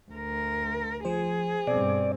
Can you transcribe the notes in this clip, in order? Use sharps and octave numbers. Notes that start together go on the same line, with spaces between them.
D2 A#4
F3 G#4 C5
G2 B2 C4 D5